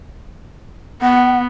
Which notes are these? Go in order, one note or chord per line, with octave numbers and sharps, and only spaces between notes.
B3 F#5